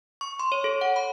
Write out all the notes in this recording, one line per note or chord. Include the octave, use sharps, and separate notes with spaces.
C#6
C6
C#5
A4
F#5
B5